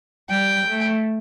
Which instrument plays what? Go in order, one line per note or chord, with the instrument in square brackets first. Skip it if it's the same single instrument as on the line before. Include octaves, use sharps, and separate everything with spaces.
[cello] G3 [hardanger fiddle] G5
[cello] A3